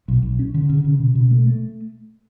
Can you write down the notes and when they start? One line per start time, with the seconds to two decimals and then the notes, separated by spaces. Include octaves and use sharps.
0.08 B1
0.23 B1
0.39 C#4
0.54 D3
0.69 C#3
0.84 C#3
1.00 B2
1.15 B2
1.31 A3
1.47 A3